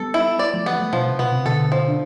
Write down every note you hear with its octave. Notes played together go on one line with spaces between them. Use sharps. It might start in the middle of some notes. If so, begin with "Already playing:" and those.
Already playing: G3 B3 A4
E4
D5
F3 A3
E3 G3 B3
F3 A3
B2 F3
C3
B2 B3
C3
B2 D3 A4
F3
D4